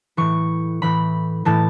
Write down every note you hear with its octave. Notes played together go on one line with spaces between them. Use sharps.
A2 E3 C#6
A2 E3 B5
A2 E3 A5